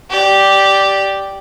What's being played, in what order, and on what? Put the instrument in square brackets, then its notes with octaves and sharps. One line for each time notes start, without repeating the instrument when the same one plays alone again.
[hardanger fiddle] G4 D5